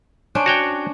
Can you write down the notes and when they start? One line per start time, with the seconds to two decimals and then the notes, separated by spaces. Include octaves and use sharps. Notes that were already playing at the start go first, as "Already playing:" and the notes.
0.35 C#4 D4 C5
0.46 F#4 C#5 G5